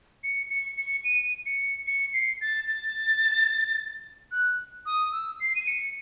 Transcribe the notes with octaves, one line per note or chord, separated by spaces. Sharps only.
C#7
C#7
C#7
D#7
C#7
C#7
C7
A6
A6
F#6
D#6
E6
C7
D#7
C#7